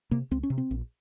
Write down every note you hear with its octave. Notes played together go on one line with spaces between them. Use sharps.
C3 A#3
C#2 C4
C#4
C3
C4
A#1